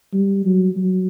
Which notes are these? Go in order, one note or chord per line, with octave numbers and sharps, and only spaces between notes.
G3
F#3
F#3